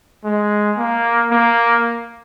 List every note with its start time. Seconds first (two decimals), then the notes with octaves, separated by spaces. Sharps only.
0.24 G#3
0.77 A#3
1.31 A#3